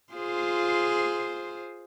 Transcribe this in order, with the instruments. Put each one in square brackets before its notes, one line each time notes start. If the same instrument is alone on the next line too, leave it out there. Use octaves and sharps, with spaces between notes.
[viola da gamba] F4 G#4 C5